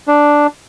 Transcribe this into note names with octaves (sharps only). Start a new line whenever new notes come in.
D4